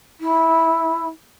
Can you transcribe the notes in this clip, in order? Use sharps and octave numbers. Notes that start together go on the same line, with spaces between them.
E4